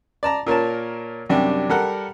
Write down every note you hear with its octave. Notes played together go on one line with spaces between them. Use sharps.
D5 A5 A#5
A#2 A#4 C#5 A5
F#2 C3 G3 D4
G3 A4 A#4 F#5